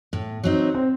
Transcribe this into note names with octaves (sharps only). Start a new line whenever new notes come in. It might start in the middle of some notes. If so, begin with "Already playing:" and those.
A2
F#3 C4 D#4
C4